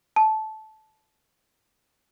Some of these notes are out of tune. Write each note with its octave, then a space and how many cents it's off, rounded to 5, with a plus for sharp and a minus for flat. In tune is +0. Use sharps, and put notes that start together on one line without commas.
A5 -15